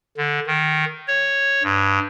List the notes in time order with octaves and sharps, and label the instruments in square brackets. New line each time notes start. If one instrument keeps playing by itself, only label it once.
[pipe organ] D3
D#3
C#5
G2